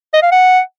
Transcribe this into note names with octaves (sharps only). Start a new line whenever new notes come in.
D#5
F5
F#5